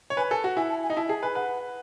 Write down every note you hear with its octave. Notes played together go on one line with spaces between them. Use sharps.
C#5
B4 G#5
A4 G#5
F#4
E4 G#5
A5
G#5
D#4
E4 A5
G#4 A5
B4 G#5
B4 F#5